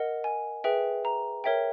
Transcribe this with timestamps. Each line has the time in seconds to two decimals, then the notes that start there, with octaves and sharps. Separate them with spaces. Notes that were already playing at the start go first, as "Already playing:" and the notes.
Already playing: A#4 D#5 F#5
0.24 G#5
0.64 G#4 B4 E5 G5
1.05 A#5
1.44 A#4 C#5 E5 G5